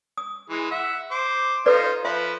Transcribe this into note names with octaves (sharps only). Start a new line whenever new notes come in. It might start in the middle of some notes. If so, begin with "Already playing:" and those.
D#6
E3 G#3
E5 F#5
C5 D6
D#4 F4 A4 B4 C5 D5
F3 B4 E5